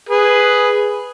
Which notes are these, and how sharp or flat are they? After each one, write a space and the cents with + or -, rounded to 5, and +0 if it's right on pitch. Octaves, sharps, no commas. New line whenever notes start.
G#4 +0 B4 +0